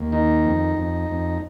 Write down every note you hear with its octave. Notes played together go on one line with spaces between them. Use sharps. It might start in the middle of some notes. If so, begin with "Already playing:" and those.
Already playing: D#2
D#3 D#4
F2
F2
F2